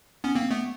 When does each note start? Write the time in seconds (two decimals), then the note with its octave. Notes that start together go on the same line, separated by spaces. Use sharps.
0.24 B3 C#4
0.35 A#3 C4
0.51 A3 B3